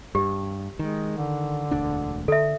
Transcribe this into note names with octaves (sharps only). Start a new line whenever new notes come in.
G2 G4
D#3 G#3
D3
E1 D2 D4
D3 A4 E5